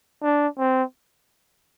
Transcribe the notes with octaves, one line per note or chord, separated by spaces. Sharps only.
D4
C4